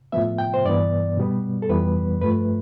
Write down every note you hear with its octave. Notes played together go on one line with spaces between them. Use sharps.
A2 F3 B3 E5
G5
C5
G2 E3 B3 D5
B2 G3 B3
A4
F2 E3 G3 B3 B4
G2 F3 A3 B4